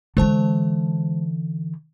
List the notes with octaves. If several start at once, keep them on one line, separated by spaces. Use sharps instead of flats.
D3 E3 G#3 C5 A5